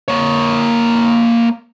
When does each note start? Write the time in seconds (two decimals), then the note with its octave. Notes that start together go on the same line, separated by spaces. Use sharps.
0.08 A#3 C#5